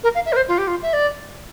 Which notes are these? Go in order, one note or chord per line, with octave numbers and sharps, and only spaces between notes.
A#4
F5
E5
A#4
C5
F4
G4
F4
E5
D5